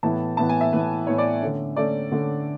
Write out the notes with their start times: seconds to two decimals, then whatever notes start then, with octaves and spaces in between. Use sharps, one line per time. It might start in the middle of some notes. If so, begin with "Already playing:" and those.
0.03 A2 E3 B3 E4 A5
0.37 A2 E3 B3 E4 A5
0.49 G#5
0.61 E5
0.72 A2 E3 B3 E4 B4
1.07 A2 E3 B3 E4 C#5
1.18 D5
1.42 D3 A3 C#4
1.76 D3 A3 C#4 D5
2.11 D3 A3 C#4